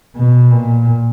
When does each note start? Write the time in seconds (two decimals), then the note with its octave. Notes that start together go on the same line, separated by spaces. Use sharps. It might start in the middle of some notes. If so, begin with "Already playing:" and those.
0.16 B2
0.52 A#2